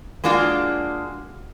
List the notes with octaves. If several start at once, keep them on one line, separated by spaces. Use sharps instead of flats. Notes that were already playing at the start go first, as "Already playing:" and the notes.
G#3 A#3 D4 F4 F#4